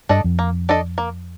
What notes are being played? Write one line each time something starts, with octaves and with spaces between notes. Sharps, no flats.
G2 D4 A4 D#5
F2
A#3
D4 A4 D#5
A#3